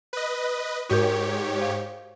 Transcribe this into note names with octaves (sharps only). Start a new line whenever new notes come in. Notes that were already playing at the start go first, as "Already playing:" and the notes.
B4 D#5
G#2 F#4 G4 A#4 C#5
C5 F5